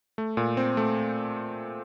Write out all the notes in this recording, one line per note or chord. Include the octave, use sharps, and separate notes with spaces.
A3
A#2
C4
A3